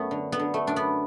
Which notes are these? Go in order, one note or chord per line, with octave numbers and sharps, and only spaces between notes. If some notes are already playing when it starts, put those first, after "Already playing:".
Already playing: F#2 A3 B3
D3
B3
D3
A3
F#2 D4
B3